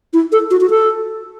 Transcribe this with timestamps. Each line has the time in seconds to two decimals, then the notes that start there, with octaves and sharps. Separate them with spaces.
0.13 E4
0.32 A4
0.51 F#4
0.61 F#4
0.70 A4